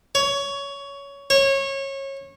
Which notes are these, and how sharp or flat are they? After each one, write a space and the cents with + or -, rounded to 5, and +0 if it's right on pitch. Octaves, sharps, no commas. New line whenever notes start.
C#5 +15
C#5 -25